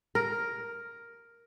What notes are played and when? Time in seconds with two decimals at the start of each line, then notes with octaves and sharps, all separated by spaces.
0.15 A#4